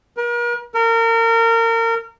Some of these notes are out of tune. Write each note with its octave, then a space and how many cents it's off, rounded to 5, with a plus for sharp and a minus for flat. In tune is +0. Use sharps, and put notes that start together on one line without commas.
A#4 +40
A#4 -30